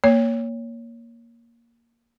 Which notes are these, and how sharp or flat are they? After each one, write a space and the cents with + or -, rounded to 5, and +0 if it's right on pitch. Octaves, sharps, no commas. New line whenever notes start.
A#3 +0 C#5 +10